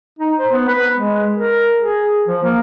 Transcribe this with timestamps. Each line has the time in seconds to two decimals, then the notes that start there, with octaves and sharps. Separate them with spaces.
0.19 D#4
0.38 C5
0.52 B3
0.68 B4
0.96 G#3
1.34 A#4
1.78 G#4
2.28 F3
2.43 A#3